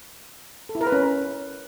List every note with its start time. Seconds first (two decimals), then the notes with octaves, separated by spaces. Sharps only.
0.69 A4
0.75 E4
0.81 A#4
0.87 B4
0.92 C#4